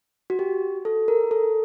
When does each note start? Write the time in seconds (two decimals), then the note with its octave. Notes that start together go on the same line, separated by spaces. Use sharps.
0.30 F#4
0.39 G4
0.85 A4
1.08 A#4
1.31 A4